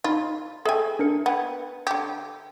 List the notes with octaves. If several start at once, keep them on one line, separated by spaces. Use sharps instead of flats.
D#4 F4 B5
G#4 A4 E5 G5 G#5
D4 A#4 C#7
B3 F#5 G5 G#6
D3 G4